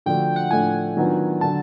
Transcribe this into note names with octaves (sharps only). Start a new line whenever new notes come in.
D3 F3 A3 D4 F#4 G5
F#5
A2 F3 A3 D4 G#5
D#3 F#3 B3 D4 F4
D3 F#3 A5